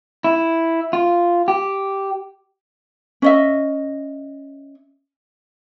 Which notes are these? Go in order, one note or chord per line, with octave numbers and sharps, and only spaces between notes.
E4
F4
G4
C#4 D#5 E5